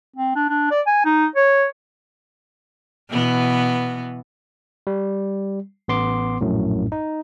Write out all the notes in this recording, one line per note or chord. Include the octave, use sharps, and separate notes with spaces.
C4
D4
D4
D5
G#5
D#4
C#5
B2 E3 B3
G3
A1 B3 C6 D6
A#1 F#2 A2
D#4